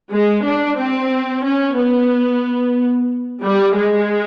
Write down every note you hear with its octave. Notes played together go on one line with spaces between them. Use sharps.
G#3
D4
C4
C#4
B3
G3
G#3